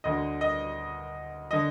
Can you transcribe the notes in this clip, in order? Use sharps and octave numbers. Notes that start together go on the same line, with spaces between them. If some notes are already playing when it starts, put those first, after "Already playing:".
D2 D3 D#5
D#5
D3 D#5